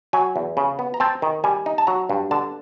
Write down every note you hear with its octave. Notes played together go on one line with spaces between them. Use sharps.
F#3 G#5
E2
C#3
B3
A#5
C4 A5
D#3
G3 G#5
D#4
A5
F#3 A#5
G2
D3 A5